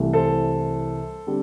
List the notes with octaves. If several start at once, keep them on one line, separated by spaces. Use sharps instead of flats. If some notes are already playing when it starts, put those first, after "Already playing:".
Already playing: C2 C3 E3 A3
A4 C5
D3 G3 C4